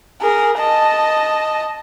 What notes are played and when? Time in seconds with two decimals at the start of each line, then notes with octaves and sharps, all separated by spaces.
0.21 G#4 A#4
0.59 D#5 A5